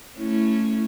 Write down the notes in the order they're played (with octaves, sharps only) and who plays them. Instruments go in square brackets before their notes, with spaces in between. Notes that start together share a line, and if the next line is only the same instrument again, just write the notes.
[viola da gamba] A3 C#4 [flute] E4